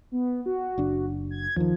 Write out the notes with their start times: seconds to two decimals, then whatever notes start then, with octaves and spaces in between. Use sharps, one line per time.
0.12 B3
0.46 F#4
0.78 F#1 D4
1.31 G#6
1.56 D#2 D#3 F3